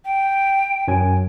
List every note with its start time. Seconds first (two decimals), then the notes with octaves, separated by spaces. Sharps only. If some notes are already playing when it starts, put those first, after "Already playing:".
0.05 G5
0.88 F#2 F#3 G#5